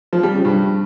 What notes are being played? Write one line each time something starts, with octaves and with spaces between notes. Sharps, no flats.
F3
G3
C#3
G2